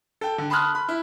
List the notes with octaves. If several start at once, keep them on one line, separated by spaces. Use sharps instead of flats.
A4 G5
D3
A5 B5 C6 D#6 F6 F#6
B5
E4